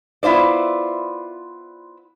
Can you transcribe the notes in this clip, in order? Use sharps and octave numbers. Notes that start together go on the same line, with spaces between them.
B3 E4 F4 C5 D5